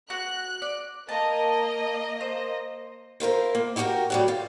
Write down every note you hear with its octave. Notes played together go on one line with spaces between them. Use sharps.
F#4 F#6
D5
A#3 D#5 A5
C5
E4 F4 A#4 C5
A#3
E4 F#4 G4 A#4 G5
A2 F#3 G3
F4